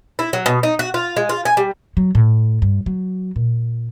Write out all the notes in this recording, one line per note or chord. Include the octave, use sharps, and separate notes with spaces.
E4
F#3
B2
D#4
F#4
F4
G#3
F4
G#5
G3
F#3
A2
G2
F#3
A#2